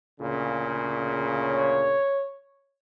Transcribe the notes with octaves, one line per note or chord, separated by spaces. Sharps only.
D2 A#2 C#3
C#5